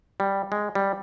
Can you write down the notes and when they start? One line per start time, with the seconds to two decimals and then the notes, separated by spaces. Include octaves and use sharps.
0.20 G3
0.52 G#3
0.75 G3